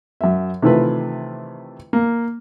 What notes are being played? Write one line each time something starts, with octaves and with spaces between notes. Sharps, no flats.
F#2 E5
C3 D#3 E3 A3 F4 B4
A#3